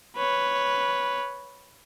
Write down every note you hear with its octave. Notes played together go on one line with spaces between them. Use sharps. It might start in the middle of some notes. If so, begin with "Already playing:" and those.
B4 C#5